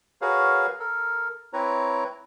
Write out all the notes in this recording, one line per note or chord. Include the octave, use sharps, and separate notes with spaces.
F#4 G#4 A#4 B4 C#5 F5
A4 A#4
C4 E4 B4 C#5 A#5